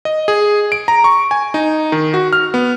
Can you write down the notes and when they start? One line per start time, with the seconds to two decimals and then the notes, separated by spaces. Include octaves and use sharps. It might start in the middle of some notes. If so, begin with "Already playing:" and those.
0.05 D#5
0.28 G#4
0.72 D7
0.88 A#5
1.04 C#6
1.31 G#5
1.54 D#4
1.92 D#3
2.14 F#4
2.33 F6
2.54 B3